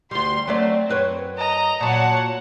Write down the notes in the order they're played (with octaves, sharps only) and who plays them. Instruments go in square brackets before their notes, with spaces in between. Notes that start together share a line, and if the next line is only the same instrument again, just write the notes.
[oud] D2 G3 [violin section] C6
[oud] F#3 A3 D5 [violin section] C4
[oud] F#2 B4 C#5
[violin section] D#5 A#5
[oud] A#2 F#3 [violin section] C#5 F#5 A5